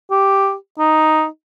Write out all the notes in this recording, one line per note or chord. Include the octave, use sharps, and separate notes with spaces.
G4
D#4